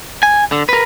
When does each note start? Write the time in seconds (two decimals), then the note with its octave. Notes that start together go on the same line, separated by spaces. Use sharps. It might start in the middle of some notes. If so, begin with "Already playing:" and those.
0.23 G#5
0.52 D3
0.69 A#4 B4